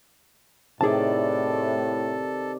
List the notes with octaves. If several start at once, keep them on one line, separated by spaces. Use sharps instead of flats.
A2 C3 D#3 G#4 A4 D5 A5